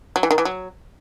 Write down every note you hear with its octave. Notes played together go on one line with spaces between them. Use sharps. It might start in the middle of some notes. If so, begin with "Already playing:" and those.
F#3
E3
D#3
E3
F#3